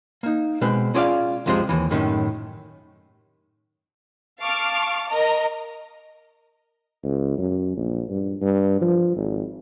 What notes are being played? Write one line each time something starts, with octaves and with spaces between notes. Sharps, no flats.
A#3 D#4
B2 G#3 C4 B4
C#4 F4 G#4 D5 D#5 F5
C2 F#2 C3 F3 G#3 C4
D#2 E3
F#2 A2 C3 D#3 C#4
F5 A5 C#6 D6 F6
A#4 D#5 A#5
C#2
F#2
A#1
G2
G2
F3
G#1